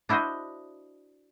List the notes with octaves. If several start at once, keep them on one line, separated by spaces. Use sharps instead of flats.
D4 E4 F#4 C5 D#5